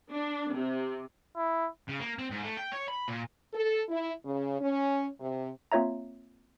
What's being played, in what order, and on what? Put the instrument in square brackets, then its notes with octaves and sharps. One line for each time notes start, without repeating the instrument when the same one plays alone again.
[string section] D4
C3
[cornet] E4
[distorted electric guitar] C#3
A#3
C4
G#2
A3
G5
C#5
B5
A#2
[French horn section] A4
E4
C#3
C#4
C3
[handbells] A#3 C4 F4 C#5 E5 A#5